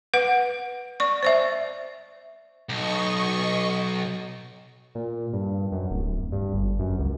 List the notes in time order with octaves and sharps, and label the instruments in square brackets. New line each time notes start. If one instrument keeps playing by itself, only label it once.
[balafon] B4 F#5
D5 C#6
C5 D5 E5
[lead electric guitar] B1 [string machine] D#5 C#6
[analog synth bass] A#2
G2
F#2
D1
G2
G1
F#2
C#2